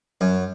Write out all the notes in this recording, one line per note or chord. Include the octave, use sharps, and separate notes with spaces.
F#2